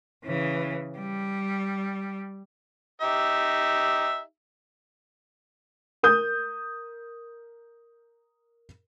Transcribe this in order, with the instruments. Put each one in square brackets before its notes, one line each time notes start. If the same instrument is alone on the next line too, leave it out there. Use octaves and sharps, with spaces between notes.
[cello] C#3 E3
G3
[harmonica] D#4 G4 E5
[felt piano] A#4 D#6 G6